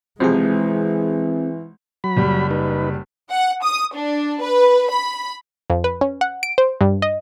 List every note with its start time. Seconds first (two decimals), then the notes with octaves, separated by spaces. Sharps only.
0.20 B1 C3 E3 F3 G#3 C4 G#4
2.04 F#3 B5
2.17 F#1 G3
2.51 D#4 B4
3.31 F#5
3.63 D#6
3.94 D4
4.43 B4
4.91 B5
5.70 F2
5.84 B4
6.01 C#4
6.21 F#5
6.43 D7
6.58 C5
6.81 G2
7.02 D#5